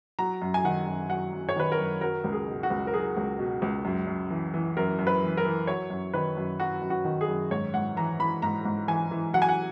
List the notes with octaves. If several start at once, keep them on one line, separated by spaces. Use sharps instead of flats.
F#3 A#5
F#2
G#5
D#3 F#5
F#2
F#3 F#5
F#2
C#5
D#3 B4
A#4
F#2
F#3 A#4
C#2
G#4
B2
F#4
C#2
A#4
F#3 G#4
C#2
B2
C#2
F#2
F#2
E3
E3
F#2 A#4
F#2
B4
E3
A#4
E3
F#3 C#5
F#2
D#3 B4
F#2
F#3 F#4
F#2
F#4
D#3
G#4
F#2
G#2 C#5
G#2 F#5
E3 A#5
E3 B5
G#2 A#5
G#2
E3 G#5
E3
F#3 F#5
G#5
F#5